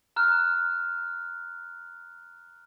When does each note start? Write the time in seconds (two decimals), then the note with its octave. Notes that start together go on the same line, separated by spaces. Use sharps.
0.16 A#5 F6 F#6